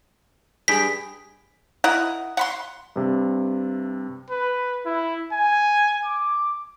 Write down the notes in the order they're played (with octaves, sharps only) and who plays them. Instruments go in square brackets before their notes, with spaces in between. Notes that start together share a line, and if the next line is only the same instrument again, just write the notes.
[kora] G2 G#4 G5 [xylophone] B6
[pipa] E4 A#4 D#5 F#5
F#5 B5 C6
[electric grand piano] G2 C3
[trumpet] B4
E4
G#5
D6